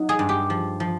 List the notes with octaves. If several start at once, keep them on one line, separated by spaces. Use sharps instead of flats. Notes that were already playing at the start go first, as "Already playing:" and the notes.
Already playing: F#3 D#4
G#4
G2
G4
F3
F3